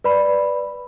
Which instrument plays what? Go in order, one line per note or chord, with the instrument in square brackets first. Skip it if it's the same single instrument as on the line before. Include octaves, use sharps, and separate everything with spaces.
[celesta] B4 D5 B5